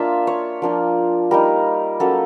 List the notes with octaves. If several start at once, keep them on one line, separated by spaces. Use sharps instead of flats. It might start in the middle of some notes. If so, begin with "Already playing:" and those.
Already playing: A#3 D4 F4 E5
C#5
F3 A#3 D4 F4
G3 A#3 D#4 A#4
F#3 A#3 C#4 A4